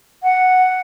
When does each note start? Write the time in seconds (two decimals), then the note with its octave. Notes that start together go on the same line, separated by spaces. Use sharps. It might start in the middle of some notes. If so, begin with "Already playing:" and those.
0.23 F#5